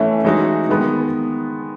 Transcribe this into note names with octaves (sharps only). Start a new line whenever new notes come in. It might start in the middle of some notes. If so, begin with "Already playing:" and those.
Already playing: A2 E3 A3 C#4 E4
E3 G#3 D#4 F#4
D#3 G#3 B3